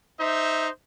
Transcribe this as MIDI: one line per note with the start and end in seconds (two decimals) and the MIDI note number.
0.19 0.69 63
0.19 0.69 72
0.19 0.69 76